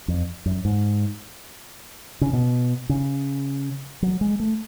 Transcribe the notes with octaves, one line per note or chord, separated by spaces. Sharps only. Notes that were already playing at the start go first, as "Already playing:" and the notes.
F2
F#2
G#2
C#3
B2
C#3
F#3
G#3
A3